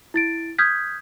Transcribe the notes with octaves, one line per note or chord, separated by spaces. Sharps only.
E4 A6 D7
D#6 F6 G6 G#6 B6